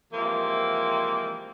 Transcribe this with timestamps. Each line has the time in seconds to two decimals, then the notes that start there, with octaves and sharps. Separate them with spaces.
0.13 C3 E3 F3 G#3 A#3